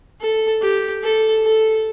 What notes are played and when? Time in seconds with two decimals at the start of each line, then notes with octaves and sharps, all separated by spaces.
0.20 A4
0.61 G4
1.03 A4
1.44 A4